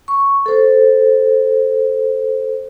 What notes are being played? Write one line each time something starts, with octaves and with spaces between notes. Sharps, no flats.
C#6
A4 C5